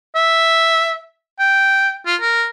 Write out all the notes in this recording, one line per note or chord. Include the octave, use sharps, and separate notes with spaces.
E5
G5
F4
A#4